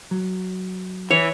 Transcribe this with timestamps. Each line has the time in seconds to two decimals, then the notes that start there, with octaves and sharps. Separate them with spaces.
0.11 F#3
1.11 E3 C#5